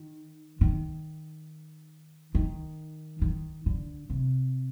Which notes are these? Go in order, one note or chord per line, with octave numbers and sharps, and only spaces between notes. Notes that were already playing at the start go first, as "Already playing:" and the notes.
Already playing: D#3
D#3
D#3
D#3
D3
C3